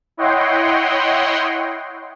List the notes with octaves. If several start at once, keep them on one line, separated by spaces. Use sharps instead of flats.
E4 C#5 D#5 F#5 G5 C6